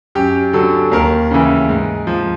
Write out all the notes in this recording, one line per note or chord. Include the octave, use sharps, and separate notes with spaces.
F#2 G4
D3 F#3 A4
D#2 A#4
C#3 E3
G#2
F3